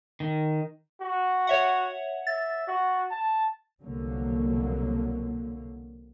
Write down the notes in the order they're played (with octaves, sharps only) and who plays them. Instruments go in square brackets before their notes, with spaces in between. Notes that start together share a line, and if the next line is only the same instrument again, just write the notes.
[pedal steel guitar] D#3
[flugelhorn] F#4
[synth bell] C#5 E5 F#5
[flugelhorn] E5 [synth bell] A6
[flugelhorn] F#4
A5
[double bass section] C2 B2 D3 F3 F#3 A#3